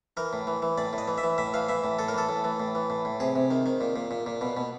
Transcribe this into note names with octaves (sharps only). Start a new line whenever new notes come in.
E3 A#4
A2
E3
E3
A2 D5
A2
D#5
E3
E5
E3
A2 E5
E3 F5
E3 E5
A2
A2 A4
A#4
E3 A4
A2
E3
A2
E3
A2
A2
C3 G#4
C3
D#3
D#3
A#2
A#2
A#2
A#2
B2
B2